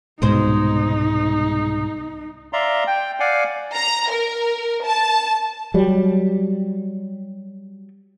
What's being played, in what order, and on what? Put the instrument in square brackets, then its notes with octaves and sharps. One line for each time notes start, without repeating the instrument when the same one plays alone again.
[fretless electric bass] C2 G#2 B2 [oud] G#3 C5 [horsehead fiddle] D#4
[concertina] D5 E5 F5 A#5 C6
G5
D5 F5 F#5 G#5
[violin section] A#5
A#4
A5
[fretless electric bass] F#3 G3